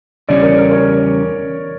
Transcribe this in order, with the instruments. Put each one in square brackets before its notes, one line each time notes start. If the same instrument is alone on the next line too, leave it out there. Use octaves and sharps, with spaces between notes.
[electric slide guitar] E2 C#3 G3 C#4 [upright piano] D5
[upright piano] A#4
A#4
C#5